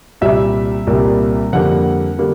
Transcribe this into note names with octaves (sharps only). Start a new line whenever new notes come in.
C2 A#2 G3 A#3 E5
C2 A#2 G3 A#3
F2 D3 G3 A#3 F#5
D3 G3 A#3